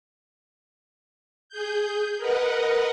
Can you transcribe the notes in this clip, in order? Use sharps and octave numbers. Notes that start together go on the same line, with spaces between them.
G#4 G6
A#4 B4 D#5 F#5